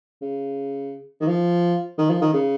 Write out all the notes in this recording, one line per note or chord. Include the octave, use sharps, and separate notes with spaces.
C#3
D#3
F3
D#3
F3
D#3
C#3